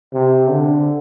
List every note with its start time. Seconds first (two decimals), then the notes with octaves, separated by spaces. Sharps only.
0.13 C3
0.50 D3